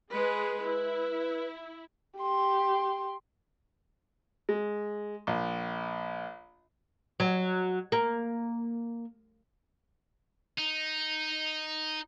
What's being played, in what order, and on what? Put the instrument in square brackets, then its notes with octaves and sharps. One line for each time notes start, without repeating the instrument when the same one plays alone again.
[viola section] G#3 G#4 B4
[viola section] E4 [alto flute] B4
[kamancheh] G4 C6
[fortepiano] G#3
A#1
[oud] F#3
A#3
[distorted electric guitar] D#4